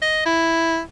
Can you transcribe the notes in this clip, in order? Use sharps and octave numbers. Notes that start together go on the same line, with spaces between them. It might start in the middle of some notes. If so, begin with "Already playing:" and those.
D#5
E4